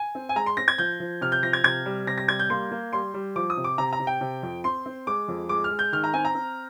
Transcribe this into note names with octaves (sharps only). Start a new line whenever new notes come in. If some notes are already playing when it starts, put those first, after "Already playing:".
Already playing: G#5
C4
G#5
G#3 A#5
C6
C4 A#6
G#6
F3 G6
F3
C3 F6
G6
F3 A#6
G#6
C3 G#6
G3
C3 A#6
A#6
G3 G#6
G6
A#3 C6
A#3
G3 C6
G3
F3 D6
D#6
C3
D6
C3 A#5
A#5
C3
G5
C3
F2
C4 C6
C4
G#3 D6
F2
G#3 D6
F6
G#3
G6
D#3 F6
A#5
C4 G#5
A#5
C4